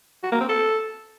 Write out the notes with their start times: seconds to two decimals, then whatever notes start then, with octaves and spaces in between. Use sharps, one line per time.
0.23 F#4
0.32 A#3
0.40 C4
0.49 A4